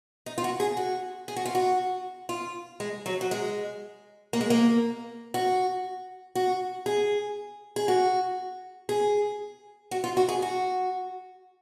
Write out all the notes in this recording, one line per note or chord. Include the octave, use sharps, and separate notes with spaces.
D#4
F4
F#4
G#4
F#4
G#4
F#4
F4
F#4
F4
G#3
F#3
F#3
G#3
A#3
G#3
A#3
F#4
F#4
G#4
G#4
F#4
G#4
F#4
F4
F#4
G#4
F#4